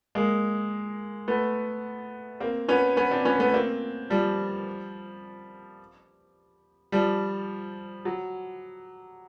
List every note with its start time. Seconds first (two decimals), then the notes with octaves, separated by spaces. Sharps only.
0.15 G#3 A#3
1.28 A3 B3
2.40 A#3 C4
2.68 B3 C#4
2.97 B3 C#4
3.11 C4 D4
3.25 B3 C#4
3.39 A3 B3
3.54 A#3 C4
4.10 F3 G3
6.92 F3 G3
8.05 F#3